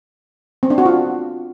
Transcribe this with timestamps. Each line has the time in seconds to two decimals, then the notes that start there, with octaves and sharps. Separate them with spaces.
0.63 C4
0.70 D4
0.78 F#4
0.86 F4